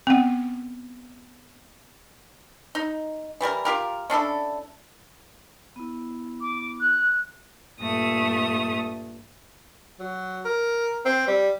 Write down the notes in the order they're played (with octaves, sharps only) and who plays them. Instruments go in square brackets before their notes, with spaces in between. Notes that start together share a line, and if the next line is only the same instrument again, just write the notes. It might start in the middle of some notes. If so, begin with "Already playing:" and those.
[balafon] B3 C4
[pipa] D#4
E3 G3 E4 A#4
F4 G4 A#4
C#4 D4 E4 A4
[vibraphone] B3 E4
[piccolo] D6
F#6
[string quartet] G2 A#2 A3 D#6
[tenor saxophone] F#3
A#4
C4
G3